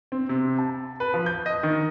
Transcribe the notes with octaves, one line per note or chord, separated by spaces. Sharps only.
C4
C3
A5
B4
F3
G6
D#5
D#3